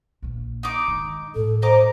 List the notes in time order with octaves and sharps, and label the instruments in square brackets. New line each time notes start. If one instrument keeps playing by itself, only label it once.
[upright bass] A#1 A#3
[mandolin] D#4 D6
[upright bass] D#3 G#3
[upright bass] A2 [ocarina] A4
[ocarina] C5 [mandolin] D#5 A#5 D6